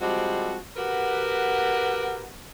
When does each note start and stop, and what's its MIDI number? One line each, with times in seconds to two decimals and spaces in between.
0.01 0.58 53
0.01 0.58 55
0.01 0.58 56
0.01 0.58 60
0.01 0.58 66
0.77 2.29 66
0.77 2.29 67
0.77 2.29 70
0.77 2.29 71
0.77 2.29 78